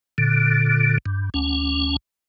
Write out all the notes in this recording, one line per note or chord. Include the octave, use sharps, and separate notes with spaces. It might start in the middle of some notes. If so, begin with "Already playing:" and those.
A#2 D3
G2
D2 C#4